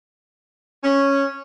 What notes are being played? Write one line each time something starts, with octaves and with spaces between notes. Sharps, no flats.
C#4